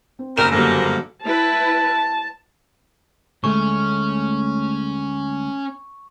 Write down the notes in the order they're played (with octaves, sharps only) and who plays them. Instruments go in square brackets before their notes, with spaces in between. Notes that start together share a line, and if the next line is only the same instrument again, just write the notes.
[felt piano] C4
[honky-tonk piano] F#1 E7 [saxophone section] D#3 A#3 A#4
[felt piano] G1 F#3 A4 [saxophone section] G#2 C3 A#3
[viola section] E4 B4 [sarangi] A5
[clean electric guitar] D2 G#3 A3 [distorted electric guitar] C#4 [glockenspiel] C#6